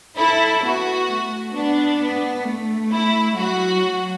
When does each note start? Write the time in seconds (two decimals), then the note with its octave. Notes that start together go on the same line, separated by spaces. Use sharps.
0.17 E4 A4
0.62 B3 F#4
1.08 A3
1.53 B3 D4
1.99 B3
2.44 A3
2.90 E4
3.34 F#3 F#4
3.81 F#3